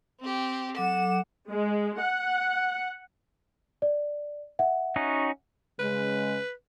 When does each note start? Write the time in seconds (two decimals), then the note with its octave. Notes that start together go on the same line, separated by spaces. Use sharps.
0.20 C4 G4
0.77 F#3 A4 F#5 D6 E7
1.51 G#3
2.01 F#5
3.82 D5
4.59 E5 F#5
4.96 C#4 D#4 F#4
5.79 C#3 G#3 B4